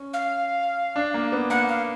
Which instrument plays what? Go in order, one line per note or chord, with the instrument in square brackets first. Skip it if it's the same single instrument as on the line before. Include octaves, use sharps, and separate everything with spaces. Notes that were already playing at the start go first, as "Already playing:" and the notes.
Already playing: [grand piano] C#4
[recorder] F5
[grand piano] D4
A#3
B3
[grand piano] A#3 [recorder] F#5
[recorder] F5